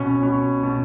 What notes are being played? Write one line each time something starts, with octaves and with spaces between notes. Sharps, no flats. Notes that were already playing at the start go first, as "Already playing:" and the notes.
Already playing: B2 C#4 C#5
B2
B2